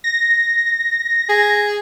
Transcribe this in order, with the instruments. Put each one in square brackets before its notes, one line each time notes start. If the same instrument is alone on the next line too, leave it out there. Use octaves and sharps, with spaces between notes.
[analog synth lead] A#6
[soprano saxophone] G#4